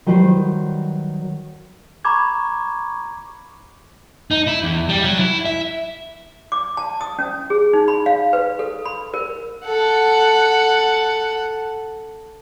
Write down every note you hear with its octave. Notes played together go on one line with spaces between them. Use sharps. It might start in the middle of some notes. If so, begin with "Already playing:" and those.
D#3 F#3 G3 F#4 B4 C5
A#5 B5 C#6 D6 G#6
D#4
E4
E2
G3
F#3
E4
E5
D6
A5
D#6
C#4
G#4
D#4
B5
F5
B4
A4
B5
A#4
A4 F#5